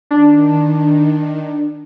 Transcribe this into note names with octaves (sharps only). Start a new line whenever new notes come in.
D#3 D4